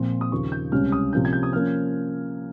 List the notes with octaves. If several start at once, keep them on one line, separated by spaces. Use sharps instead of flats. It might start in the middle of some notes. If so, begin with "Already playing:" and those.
Already playing: A#2 F3 C4 C6
D#6
D#2 C#3 F3 A#3 C#6
G6
C#2 C3 G3 C#4 F6
D#6
C3 F3 A#3 C#4 G6
G#6
G6
D#6
F3 A#3 C#4 F6